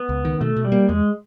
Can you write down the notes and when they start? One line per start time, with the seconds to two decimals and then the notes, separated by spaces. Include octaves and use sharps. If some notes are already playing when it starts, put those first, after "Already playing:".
Already playing: B3
0.09 C#2
0.25 D#3
0.41 B2 A3
0.56 B2
0.65 G3
0.72 A#3
0.88 E2 G#3